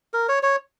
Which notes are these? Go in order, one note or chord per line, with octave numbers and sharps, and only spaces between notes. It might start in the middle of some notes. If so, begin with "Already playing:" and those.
A#4
C#5
C#5